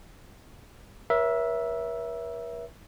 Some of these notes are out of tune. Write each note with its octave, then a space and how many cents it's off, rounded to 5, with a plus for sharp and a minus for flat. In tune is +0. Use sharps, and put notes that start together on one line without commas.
A#4 +45 C#5 +0 E5 +0